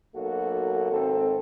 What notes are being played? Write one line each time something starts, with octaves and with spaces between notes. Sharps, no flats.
B1 A#3 F#4 A4
G#1 C4 A4